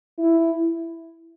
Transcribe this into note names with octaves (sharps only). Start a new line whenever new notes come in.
E4